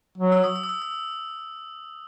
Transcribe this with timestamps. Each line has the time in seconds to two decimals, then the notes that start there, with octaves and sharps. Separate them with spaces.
0.18 F#3
0.32 E6
0.44 D#6
0.56 E6
0.64 D#6
0.69 E6
0.82 E6